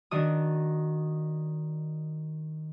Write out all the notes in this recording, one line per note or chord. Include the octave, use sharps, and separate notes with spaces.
D#3 D4 F#4 D#6